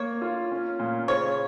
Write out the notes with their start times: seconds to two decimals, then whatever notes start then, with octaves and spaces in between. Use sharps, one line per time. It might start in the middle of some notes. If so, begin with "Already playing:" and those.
Already playing: A#3 C#5
0.22 F4
0.52 C#4
0.79 A#2
1.08 C#3 C#5